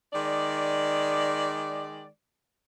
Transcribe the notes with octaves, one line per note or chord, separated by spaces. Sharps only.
D#3 G#3 D5